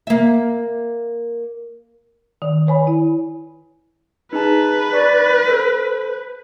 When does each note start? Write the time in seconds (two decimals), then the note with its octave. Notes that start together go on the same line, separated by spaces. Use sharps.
0.07 A#3 E5
2.42 D#3
2.67 B4 C#5 G#5 B5
2.87 E4
4.33 D#4 G#4 B4 A5
4.93 D5 C#6 A6
5.48 A4 C5